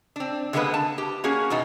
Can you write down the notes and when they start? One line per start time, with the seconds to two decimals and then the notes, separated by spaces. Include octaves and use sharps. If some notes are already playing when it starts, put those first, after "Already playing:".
0.16 C4 D4
0.53 D3 G3 G#3 A#3 B3 B4
0.74 A5
0.98 G4
1.24 A#3 C#4 F#4 G#4
1.50 E2 B2 B3 D#4